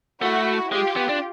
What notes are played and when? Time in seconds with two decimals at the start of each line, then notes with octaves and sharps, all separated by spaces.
0.21 A3 E4 F#4
0.72 G#3 F4 G4
0.96 B3
1.09 D4